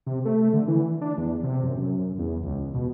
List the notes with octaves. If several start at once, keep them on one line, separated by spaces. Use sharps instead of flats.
C3
A3
D3
E3
D4
E2
C3
F#2
F#2
E2
C#2
B2